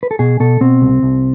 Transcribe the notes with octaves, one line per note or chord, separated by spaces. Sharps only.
B4
A4
B2 G#4
B2 A4
B2 C4
C2
C2